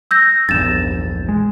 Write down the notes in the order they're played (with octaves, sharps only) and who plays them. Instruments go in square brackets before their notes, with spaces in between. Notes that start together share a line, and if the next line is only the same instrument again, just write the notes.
[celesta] E6 G6 A#6
[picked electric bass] A#1 E2 G2 [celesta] A6 E7
[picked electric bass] G#3